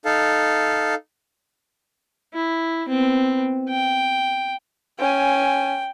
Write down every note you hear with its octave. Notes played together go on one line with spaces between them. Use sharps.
D#4 A4 F5
E4
B3 C4
G5
C#4 G5 G#5